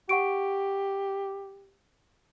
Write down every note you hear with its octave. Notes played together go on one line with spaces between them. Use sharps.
G4 F#5 C#6 D7